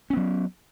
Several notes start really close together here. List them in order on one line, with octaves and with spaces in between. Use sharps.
C#4 B3 F#3